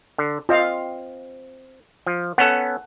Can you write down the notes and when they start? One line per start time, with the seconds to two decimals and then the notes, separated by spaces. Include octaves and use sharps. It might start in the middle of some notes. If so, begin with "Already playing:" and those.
0.18 D3
0.49 C4 F4 D#5 F5
2.06 F3
2.38 B3 C#4 A4 F#5